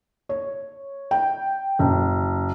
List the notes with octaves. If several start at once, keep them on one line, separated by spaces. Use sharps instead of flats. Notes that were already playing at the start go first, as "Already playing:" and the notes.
C#5
G5
F#1